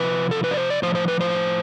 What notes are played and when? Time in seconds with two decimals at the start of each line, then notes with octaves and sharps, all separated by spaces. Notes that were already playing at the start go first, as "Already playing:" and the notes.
Already playing: C3 F3 B4
0.31 A4
0.44 B4
0.51 D5
0.57 C5
0.70 D5
0.82 A2 F3 C5
0.95 C5
1.08 B4
1.21 C5